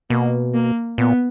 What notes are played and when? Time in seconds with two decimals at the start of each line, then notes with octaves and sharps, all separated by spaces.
0.10 B2 A#3
0.54 A#3
0.98 A#2 B3